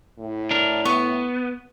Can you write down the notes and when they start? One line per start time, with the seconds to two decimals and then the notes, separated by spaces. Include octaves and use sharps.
0.19 A2
0.51 D4 A#4
0.85 B3 C#6